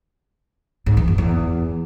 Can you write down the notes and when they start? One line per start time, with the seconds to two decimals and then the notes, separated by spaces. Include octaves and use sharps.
0.86 G#2
0.97 E3
1.07 F2
1.18 E2